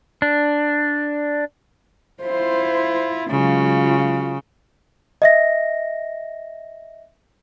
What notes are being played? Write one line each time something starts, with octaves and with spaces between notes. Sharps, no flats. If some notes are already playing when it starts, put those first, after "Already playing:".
D4
E4 F4 C5
C#3 F#3 G#3 F4 F#4
D#5 E5 A#6